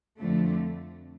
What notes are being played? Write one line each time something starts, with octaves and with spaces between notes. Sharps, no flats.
F2 D3 F3 A3